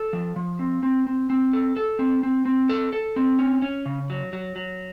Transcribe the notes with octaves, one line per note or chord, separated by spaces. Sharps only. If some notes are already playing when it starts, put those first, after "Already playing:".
Already playing: A4
F3
F3
C4
C4
C4
C4
A4
A4
C4
C4
C4
A4
A4
C4
C#4
C#4
C#3
F#3
F#3
F#3